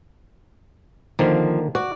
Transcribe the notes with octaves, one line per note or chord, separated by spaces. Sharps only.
D3 D#3 F3 A#3
F#4 D5